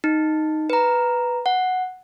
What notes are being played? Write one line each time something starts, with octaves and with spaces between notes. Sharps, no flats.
D#4
B4 A#5
F#5